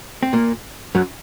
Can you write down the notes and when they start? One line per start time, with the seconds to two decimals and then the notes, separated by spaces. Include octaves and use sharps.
0.23 C4
0.33 A#2 A#3
0.95 F#2 F#3